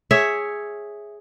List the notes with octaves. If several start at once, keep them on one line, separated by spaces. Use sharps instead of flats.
G#4 C#5 E5